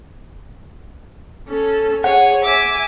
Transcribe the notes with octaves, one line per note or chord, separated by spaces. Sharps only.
C#4 A4
G#4 C#5 F#5
E5 G#5 D6